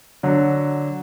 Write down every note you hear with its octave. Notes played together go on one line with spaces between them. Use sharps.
D3 F#3